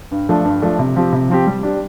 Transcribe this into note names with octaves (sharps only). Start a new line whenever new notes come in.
G2
F3 A3 D4
G2
F3 A3 D4
C3
F3 C4 G4
C3
F3 C4 G4
G3
D4 G4